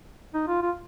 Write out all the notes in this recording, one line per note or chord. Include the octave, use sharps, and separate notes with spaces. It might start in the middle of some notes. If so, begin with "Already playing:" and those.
D#4
F4
F4